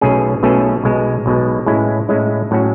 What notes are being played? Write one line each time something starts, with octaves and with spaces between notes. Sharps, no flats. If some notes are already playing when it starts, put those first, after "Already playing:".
B1 B2 A3 C#4 G#4
B1 B2 A3 C#4 G#4
B1 B2 G#3
B1 B2 G#3
A2 G#3 C#4 E4
A2 G#3 C#4 E4
A2 F#3 C#4 F#4